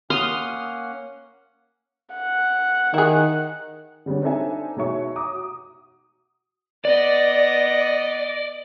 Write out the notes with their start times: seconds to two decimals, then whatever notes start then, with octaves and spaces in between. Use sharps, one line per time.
0.10 A#3 C#4 F#5 C6 D#6 F6
2.15 F#5
2.94 D#3 E4 G#4
4.06 D3 G3 G#3 B3 C#4
4.22 C4 D4 D#4 A4 E5 G#5
4.76 B2 G#3 D#4 C#5 E5 C#6
5.16 A#5 D6 D#6
5.33 F#4
6.85 B3 D5 D#5